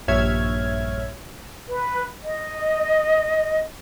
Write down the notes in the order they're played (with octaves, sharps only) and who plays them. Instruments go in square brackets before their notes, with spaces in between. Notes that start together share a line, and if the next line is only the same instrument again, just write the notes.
[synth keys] A#1 G2 C#5 E5 F6 G#6
[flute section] B4
D#5